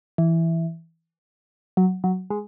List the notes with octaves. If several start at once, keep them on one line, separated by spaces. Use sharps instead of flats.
E3
F#3
F#3
G#3